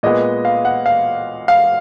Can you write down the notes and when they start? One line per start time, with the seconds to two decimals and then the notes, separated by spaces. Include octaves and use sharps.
0.03 A#2 G#3 B3 D#5
0.45 F5
0.65 F#5
0.86 F5
1.48 F5